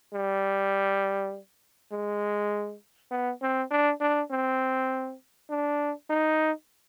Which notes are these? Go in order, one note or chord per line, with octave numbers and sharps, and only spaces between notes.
G3
G#3
B3
C4
D4
D4
C4
D4
D#4